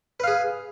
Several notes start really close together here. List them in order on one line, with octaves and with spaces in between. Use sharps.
B4 F5 G#4